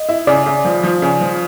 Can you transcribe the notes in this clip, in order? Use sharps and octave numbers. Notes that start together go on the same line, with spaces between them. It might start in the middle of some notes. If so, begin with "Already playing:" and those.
Already playing: D#5
E4
C#3 D5
C#3
F3
F3
C#3
F3